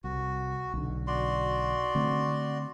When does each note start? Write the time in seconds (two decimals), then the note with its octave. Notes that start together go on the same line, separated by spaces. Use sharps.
0.04 C2 F#4
0.74 B1 D3
1.07 F#4 D5 C6
1.95 D3 A3 C4